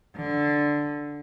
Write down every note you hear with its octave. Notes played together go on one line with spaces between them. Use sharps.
D3